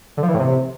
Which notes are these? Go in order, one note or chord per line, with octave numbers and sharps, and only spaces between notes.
D3
F3
E3
A2
C3